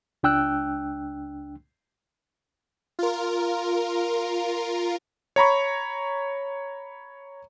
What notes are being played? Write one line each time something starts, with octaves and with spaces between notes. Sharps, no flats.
C#2 D4 G5 E6 F#6
F4 A#4
C#5 A#5 B5 C#6